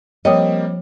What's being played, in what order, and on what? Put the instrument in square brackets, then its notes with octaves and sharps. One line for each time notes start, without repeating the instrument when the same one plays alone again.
[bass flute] F3 [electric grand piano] G3 A#3 C4 [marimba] C#5 G5 D#6 [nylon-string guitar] D#5